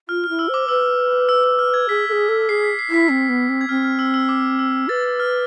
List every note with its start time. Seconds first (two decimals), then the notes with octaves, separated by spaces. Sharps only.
0.09 F4 F6
0.24 F6
0.29 E4
0.39 E6
0.48 C5
0.54 D6
0.69 B4 E6
1.29 E6
1.44 E6
1.59 F6
1.74 G#6
1.89 G#4 B6
2.09 A4
2.12 G#4
2.29 A4
2.49 G#4 C7
2.64 B6
2.79 C7
2.89 E4 B6
3.09 C4 B6
3.29 B3
3.49 C4
3.61 G#6
3.69 C4 F6
3.84 F6
3.99 E6
4.14 E6
4.29 D6
4.59 E6
4.88 B4 A6
5.04 A6
5.20 F6